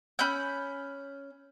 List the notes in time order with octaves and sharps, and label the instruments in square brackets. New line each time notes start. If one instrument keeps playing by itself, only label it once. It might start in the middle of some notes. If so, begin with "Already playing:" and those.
[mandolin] C#4 B5 F#6 G6